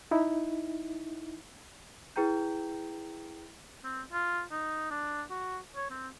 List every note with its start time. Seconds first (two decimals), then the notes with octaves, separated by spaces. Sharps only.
0.11 D#4 E4
2.16 E4 G#4 B4 G5 A#5 G6
3.84 C4
4.13 F4
4.51 D#4
4.91 D4
5.30 F#4
5.76 C#5
5.90 C4